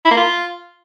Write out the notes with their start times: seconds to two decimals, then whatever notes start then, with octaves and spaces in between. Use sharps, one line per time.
0.05 E4
0.11 A#3
0.17 F4